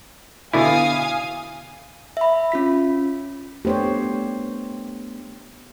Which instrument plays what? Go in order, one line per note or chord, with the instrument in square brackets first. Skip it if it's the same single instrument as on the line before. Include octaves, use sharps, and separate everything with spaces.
[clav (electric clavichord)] B2 D3 E4 [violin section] F5 G#5 D#6
[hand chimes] E5 B5
C#4 F4 B6
[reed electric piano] A3 B3 D4 [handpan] G4 C5 C#5